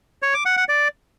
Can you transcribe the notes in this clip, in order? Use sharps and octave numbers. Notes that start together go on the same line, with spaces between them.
C#5
D6
F#5
F#5
D5